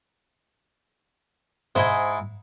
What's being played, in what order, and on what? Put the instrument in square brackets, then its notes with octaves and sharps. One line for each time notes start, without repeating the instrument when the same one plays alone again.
[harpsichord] G#2 E4 [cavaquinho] C5 D#5 G#5